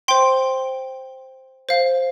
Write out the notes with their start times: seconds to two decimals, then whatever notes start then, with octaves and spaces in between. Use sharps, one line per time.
0.08 C5 G5 C6
1.69 C5 F5